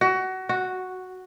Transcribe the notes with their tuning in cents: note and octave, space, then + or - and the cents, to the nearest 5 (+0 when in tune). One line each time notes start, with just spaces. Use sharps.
F#4 +25
F#4 +0